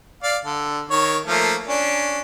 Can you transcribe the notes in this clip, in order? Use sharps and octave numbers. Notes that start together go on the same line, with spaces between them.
D5 F5
D3
D#3 C#5
F3 A3 A#3
C#4 D4